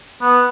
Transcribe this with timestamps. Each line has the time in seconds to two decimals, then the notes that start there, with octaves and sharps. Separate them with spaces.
0.21 B3